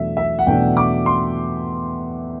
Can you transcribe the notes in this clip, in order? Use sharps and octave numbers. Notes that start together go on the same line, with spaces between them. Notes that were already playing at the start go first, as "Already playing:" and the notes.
Already playing: E2 B2 F#3 A3 D4 E5
E5
F#5
E2 B2 F#3 A3 D4 G5
D6
C6